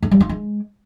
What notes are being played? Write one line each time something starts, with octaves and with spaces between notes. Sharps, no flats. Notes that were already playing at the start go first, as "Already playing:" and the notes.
A3
G3
F4
G#3